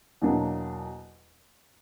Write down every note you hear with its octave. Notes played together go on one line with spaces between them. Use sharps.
E2 B2 F#3 A#3 D4